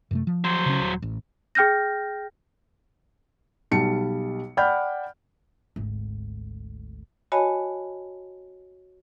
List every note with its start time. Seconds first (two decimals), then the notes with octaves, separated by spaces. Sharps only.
0.11 F#2 C3 A3
0.27 F3
0.44 F#3 C5
0.66 C#3 C#4
0.80 D#1
1.02 A1
1.55 G#4 G5 F6 G6 A#6
3.71 B1 G3 A5 C#7
4.57 D5 F#5 G5 B5 F6 G6
5.76 G#1 D2
7.32 F#4 C#5 D#5 G#5 A5 B5